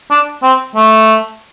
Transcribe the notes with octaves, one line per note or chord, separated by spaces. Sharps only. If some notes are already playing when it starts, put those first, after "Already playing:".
D4
C4
A3